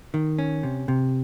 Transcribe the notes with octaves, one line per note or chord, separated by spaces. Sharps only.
D#3
C#4
C3
C3